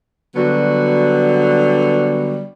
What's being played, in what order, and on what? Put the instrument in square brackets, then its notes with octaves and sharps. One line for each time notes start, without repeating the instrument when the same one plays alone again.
[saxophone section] D3 F#3 G3 B3 F#4